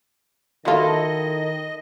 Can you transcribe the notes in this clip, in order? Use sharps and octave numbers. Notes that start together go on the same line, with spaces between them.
D#3 F#3 E4 F4 A4 D#5